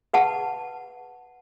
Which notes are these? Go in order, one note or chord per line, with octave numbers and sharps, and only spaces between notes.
B4 F#5 A5